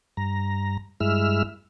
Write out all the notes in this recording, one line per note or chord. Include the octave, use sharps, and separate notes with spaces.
G2 A#5
G2 G#3 E4 E6 F6